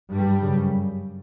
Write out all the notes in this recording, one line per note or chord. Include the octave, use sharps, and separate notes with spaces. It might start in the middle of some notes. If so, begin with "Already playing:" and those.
G2 G3
F#2 C#3